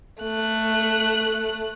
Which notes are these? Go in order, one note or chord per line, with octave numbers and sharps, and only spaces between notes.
A3 F#6